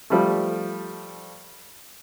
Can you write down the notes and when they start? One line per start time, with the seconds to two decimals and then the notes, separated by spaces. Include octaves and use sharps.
0.10 F3 G3 A3